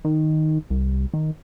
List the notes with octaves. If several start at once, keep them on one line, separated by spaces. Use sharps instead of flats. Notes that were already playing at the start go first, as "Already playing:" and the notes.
D#3
C2
D#3